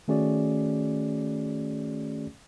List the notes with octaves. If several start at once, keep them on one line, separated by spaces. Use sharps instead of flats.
D#3 A3 C#4 F#4 G#4 D5